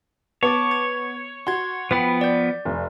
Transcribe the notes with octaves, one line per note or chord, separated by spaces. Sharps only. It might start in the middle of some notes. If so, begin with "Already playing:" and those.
B3 C#5 A5 D6 A6
G#6
F#4 C6 G#6
F3 B3 B4 G5 B5
D5 G6
F1